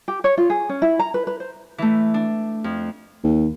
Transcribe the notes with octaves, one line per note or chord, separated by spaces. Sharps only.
G4
C#5
F4
G#4
C#4
E4
A#5
B4
B4
C5
E3 A3
D4
F2
D#2